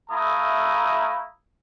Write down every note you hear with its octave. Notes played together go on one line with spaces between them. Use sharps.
A3 E4 F5 A#5 D#6